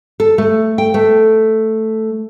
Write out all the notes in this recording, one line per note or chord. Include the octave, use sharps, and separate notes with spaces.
A4
A3
G5
A3